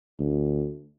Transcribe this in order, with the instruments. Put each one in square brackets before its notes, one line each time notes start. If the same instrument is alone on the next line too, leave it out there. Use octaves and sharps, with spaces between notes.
[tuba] D2